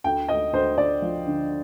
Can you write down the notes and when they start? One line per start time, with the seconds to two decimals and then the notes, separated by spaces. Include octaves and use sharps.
0.04 D2 G5
0.29 D2 D#5
0.53 D2 C5
0.77 D2 D5
1.02 F3
1.26 D3